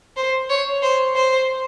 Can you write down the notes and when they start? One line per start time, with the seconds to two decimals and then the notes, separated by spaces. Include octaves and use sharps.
0.17 C5
0.50 C#5
0.82 C5
1.16 C5